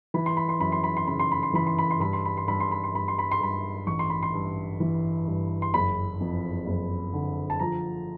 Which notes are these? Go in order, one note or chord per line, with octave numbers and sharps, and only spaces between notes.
E3 B5
C6
B5
C6
F#2 B5
C6
B5
C6
C#3 B5
C6
B5
C6
E3 B5
C6
B5
C6
G2 B5
C6
B5
C6
G2 B5
C6
B5
C6
G2 B5
C6
B5
C6
G2 B5
A1 C#6
C6
B5
C6
G2
E3
G2
C6
F#1 B5
F2
F#1
D3
A5
F3 A#5